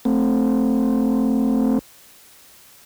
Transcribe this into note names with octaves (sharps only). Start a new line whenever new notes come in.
A3 C4